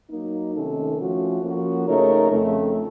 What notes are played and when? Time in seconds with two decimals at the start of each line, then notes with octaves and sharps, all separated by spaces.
0.09 F#3 A#3 D#4
0.53 C3 D#3 A3 C#4 A4
0.98 F3 A3 C#4 F#4
1.42 F3 A#3 C#4 F#4
1.86 C#3 A3 D#4 A#4 C#5
2.30 F2 C#3 A3